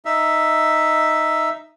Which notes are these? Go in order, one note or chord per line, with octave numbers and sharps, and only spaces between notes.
D#4 E5